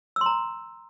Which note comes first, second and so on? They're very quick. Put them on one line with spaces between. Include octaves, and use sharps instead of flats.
E6 C6 A#5